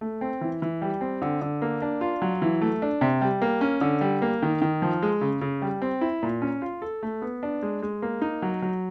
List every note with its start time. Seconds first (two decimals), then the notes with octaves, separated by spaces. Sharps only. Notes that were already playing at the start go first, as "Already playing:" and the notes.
0.01 A3
0.21 C4
0.41 E3
0.62 E3
0.82 G3
1.01 C4
1.22 D3
1.42 D3
1.62 A#3
1.82 D4
2.01 F4
2.22 F#3
2.42 E3
2.61 A3
2.82 D4
3.01 C3
3.22 G3
3.42 A#3
3.61 C#4
3.81 D3
4.01 G3
4.22 A#3
4.42 D#3
4.62 D#3
4.82 F3
5.02 G#3
5.21 C#3
5.41 C#3
5.62 G3
5.82 C4
6.01 E4
6.23 A#2
6.42 C#4
6.62 F4
6.82 A4
7.03 A3
7.22 B3
7.43 D4
7.63 G#3
7.82 G#3
8.02 A#3
8.22 D#4
8.42 F#3
8.62 F#3